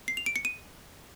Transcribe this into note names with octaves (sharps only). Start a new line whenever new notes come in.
C7
F7
D7
C#7
D#7